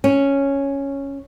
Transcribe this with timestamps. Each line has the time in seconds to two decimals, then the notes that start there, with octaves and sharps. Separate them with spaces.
0.04 C#4